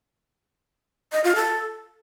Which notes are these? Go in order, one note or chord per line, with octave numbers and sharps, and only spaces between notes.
D#5
F4
A4